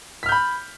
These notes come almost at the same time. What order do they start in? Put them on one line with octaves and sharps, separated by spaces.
B6 F6 G6 B5